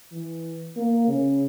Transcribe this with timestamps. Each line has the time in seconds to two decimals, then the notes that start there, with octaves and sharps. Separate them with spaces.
0.12 E3
0.77 A#3
1.08 C#3